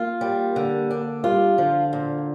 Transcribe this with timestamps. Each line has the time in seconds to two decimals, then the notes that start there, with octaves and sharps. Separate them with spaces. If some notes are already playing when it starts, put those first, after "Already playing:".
Already playing: A#3 F4
0.21 G3
0.56 D3
0.91 D4
1.24 G3 F4
1.58 D3 F3
1.93 A#2